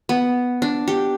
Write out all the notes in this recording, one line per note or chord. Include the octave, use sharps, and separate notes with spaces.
B3
D4
G4